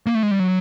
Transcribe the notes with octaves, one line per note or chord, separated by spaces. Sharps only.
A#3
A3
G#3
G3
F#3